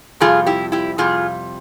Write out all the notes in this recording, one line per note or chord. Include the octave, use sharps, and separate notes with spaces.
F2 C3 G3 F4 G#4
E4 G4
E4 G4
F2 C3 G3 F4 G#4